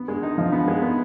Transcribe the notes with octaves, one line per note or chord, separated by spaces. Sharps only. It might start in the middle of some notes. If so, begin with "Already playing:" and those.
Already playing: B3
G#3
D#4
F3
B3
G#3
B3